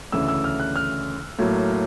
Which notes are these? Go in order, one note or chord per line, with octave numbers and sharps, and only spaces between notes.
D2 C#3 E3 E6
E6
F6
F#6
F6
A2 F#3 A#3